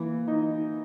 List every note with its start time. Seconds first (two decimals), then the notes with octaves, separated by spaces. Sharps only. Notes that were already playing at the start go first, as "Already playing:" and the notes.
Already playing: E3 A#3
0.27 D#4